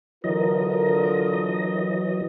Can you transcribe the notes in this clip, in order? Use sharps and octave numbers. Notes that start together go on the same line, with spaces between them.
D3 E3 F#3 F4 A#4 D#5